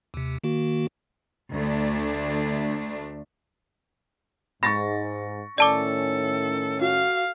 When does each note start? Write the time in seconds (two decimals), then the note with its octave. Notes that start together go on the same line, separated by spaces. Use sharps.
0.14 D#2 C3
0.44 D#3 A#3 F#4
1.52 D2 A3 D4
4.63 G#2 B5 C#6 A6 A#6
5.58 A2 D#3 C#4 A4 D5 A5 D6
6.81 F#4 F5